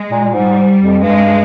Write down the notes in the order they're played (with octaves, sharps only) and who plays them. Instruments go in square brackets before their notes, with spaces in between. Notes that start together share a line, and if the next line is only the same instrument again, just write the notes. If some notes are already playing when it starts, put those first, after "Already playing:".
Already playing: [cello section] G#3
[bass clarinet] A#2
A#2
[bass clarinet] G#2 [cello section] G3
[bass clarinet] F2
[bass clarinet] G2 [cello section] G#3